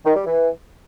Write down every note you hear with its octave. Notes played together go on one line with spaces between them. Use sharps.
D#3
G3
E3